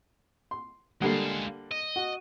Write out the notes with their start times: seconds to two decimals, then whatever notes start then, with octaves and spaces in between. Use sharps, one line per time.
0.51 C6
1.02 D3 G3 G#3 A#3 F5
1.71 D#5
1.96 F#4